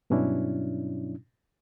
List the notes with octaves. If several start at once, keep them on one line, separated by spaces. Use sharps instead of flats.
G2 B2 F#3 C#4 D4 E4